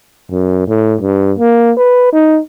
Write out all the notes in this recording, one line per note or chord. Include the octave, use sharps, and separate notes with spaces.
F#2
A2
G2
A#3
B4
D#4